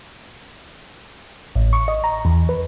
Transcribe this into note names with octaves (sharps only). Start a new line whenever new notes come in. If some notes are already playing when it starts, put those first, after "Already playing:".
A1
C#6
D#5
A#5
E2
B4